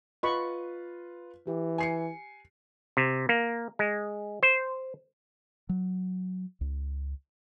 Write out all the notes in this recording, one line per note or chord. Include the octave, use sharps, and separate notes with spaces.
F4 B4 D#5 B5 C#6
E3 G4
G#5 C7 C#7
C3
A#3
G#3
C5
F#3
C#2